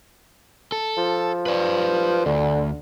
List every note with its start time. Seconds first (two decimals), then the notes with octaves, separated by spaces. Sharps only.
0.72 A4
0.98 F3
1.46 B4 D5
2.26 D2 D3